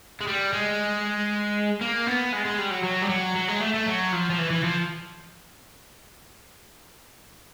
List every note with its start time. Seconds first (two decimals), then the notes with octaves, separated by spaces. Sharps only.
0.21 G#3
0.27 G3
0.53 G#3
1.81 A#3
2.07 B3
2.33 G#3
2.45 G#3
2.58 G3
2.71 F#3
2.84 F#3
3.02 G3
3.10 F#3
3.36 F#3
3.48 G#3
3.61 A3
3.74 A3
3.86 F#3
4.12 F3
4.30 F3
4.38 E3
4.51 E3
4.64 F3